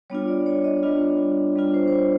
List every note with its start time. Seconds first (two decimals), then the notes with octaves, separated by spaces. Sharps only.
0.10 G3 B3 D4 F4 C#5
0.28 D5
0.46 C#5
0.64 D#5
0.83 G3 B3 D4 F4
1.56 G3 B3 D4 F4
1.74 C5
1.88 C5
1.93 C#5